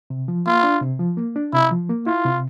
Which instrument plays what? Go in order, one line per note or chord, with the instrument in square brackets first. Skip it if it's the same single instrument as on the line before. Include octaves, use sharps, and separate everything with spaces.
[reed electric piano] C3
F3
[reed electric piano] A#3 [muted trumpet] F4
[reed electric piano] D4
C3
F3
A#3
D4
[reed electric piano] C3 [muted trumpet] E4
[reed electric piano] F3
A#3
[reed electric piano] E4 [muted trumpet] F4
[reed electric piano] C3